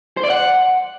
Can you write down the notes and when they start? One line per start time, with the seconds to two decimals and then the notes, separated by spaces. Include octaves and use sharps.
0.17 C5
0.23 D5
0.30 F#5